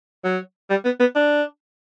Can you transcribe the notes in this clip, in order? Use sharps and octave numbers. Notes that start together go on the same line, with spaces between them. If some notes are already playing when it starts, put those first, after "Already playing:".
F#3
G3
B3
B3
D4